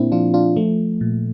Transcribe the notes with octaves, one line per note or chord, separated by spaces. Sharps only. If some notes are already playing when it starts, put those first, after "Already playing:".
Already playing: A#2 A#3 C4 D4 E4
F3 D4 F4
D4 F4
F3 A3
A#2